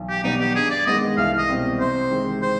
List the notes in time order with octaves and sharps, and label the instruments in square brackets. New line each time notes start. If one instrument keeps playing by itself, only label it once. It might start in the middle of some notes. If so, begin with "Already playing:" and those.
Already playing: [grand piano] B1
[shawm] G4
[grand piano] B2 G3 B3 [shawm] D#4
[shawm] G4
[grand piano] G2 [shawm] G#4
[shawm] D5
[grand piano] D#3 G#3 B3 [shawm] D#5
[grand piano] C2 [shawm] F5
[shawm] D#5
[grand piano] B2 G3 C4
[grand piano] C3 [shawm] C5
[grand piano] D#3 G#3 C4
[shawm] C5